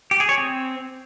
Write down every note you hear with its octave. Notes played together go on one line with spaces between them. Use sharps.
G4
G#4
C#5
C4